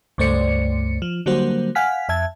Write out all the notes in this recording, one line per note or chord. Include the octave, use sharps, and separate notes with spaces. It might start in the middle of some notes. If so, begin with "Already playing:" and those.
C#2 G2 A3 C5 D5 C#7
F3
D3 F#3 G3 A#3 F#4 C5
F5 F#5 G#5 F6 B6
F2 E5 A5 G#6